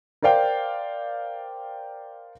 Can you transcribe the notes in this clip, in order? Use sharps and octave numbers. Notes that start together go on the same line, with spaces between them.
A#4 C5 D5 F5 G5